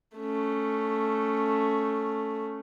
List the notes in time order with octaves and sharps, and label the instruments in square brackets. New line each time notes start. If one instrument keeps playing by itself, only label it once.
[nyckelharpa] A3 C#4